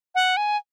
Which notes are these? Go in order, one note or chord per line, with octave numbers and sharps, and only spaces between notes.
F#5
G#5